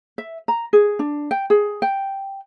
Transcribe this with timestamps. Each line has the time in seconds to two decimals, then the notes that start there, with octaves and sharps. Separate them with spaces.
0.18 E5
0.48 A#5
0.73 G#4
0.99 D4
1.31 G5
1.50 G#4
1.82 G5